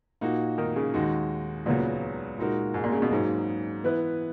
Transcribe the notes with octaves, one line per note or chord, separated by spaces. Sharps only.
A#2 A#3 D#4 F#4
D#3
C#3
D#2 D#3 G#3 D#4 F#4
C#2 A#2 C#3 F#3 B3 F#4
A#2 G#3 D#4 F#4 A#4
G#2
A#2
C#3
B2
G#2 C#3 F#3 A#3
E3 B3 E4 B4